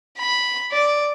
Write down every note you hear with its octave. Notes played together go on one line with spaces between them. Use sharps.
B5
D5